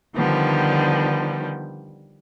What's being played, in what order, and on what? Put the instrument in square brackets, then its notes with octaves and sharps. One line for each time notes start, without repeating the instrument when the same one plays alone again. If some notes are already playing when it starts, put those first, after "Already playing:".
[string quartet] D3 D#3 F3 G3 B3